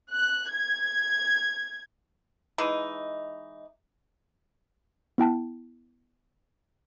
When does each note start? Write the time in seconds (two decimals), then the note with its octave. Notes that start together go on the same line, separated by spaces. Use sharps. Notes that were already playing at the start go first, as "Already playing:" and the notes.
0.13 F#6
0.50 G#6
2.58 E3 G#3 D#4
5.18 B3 E4 G5 A5